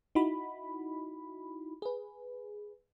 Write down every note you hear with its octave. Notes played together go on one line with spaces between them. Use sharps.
D#4 E4 F#4 B5
G#4 B4